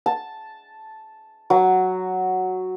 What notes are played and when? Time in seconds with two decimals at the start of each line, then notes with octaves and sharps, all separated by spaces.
0.06 A5
1.50 F#3